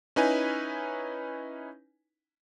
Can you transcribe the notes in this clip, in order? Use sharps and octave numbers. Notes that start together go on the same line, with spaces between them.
C#4 D#4 E4 B4 G#5